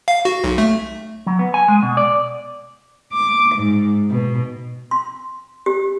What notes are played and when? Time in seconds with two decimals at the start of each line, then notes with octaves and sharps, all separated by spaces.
0.08 F5
0.25 F#4
0.44 B1
0.58 A3
1.26 F#3
1.39 B3
1.54 G#5
1.68 G#3
1.82 B2
1.97 D5
3.13 D6
3.56 G#2
4.09 B2
4.91 C6
5.66 G4